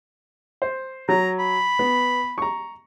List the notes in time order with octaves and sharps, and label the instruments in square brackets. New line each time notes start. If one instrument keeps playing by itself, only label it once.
[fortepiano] C5
[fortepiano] F#3 [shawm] A#5
[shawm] B5
[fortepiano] B3
A#5 C#6